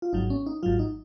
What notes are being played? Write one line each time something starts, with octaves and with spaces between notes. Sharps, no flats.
F4
G#1 G#2 F#3 D#4
C#4
D#4
G#1 G#2 F#3 F4
D#4